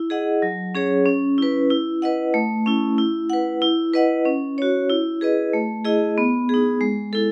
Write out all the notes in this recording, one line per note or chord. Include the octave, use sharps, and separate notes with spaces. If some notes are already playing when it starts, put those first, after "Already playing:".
Already playing: E4
G#4 D#5 F#5
F#3
C#4 G#4 C#5
C#4
E4 B4
E4
B4 D#5 F#5
A3
C#4 E4
E4
B4 F#5
E4
B4 D#5 F#5
C#4
F#4 C#5
E4
G#4 B4 D#5
A3
E4 G#4 D#5
B3
D#4 G#4
G#3
E4 A4